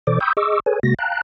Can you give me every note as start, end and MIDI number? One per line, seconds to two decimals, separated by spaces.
0.07 0.19 47
0.07 0.19 52
0.07 0.19 69
0.07 0.19 72
0.07 0.19 74
0.07 0.19 86
0.20 0.33 79
0.20 0.33 83
0.20 0.33 85
0.20 0.33 87
0.20 0.33 88
0.20 0.33 91
0.37 0.60 68
0.37 0.60 75
0.37 0.60 85
0.37 0.60 86
0.37 0.60 88
0.66 0.80 68
0.66 0.80 69
0.66 0.80 71
0.66 0.80 73
0.66 0.80 80
0.83 0.94 48
0.83 0.94 56
0.83 0.94 58
0.83 0.94 66
0.83 0.94 94
0.99 1.21 77
0.99 1.21 79
0.99 1.21 81
0.99 1.21 82
0.99 1.21 90